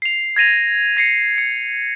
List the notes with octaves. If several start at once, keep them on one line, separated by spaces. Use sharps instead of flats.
C7 F7
G#6 A#6 D#7 F7
A#6 C7 C#7
C#7